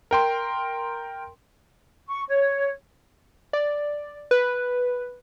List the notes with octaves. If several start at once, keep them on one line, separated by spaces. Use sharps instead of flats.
A#4 G5 C6
C#6
C#5
D5
B4